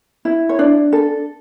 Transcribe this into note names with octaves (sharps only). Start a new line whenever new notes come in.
E4
C#5
D4 D5
A4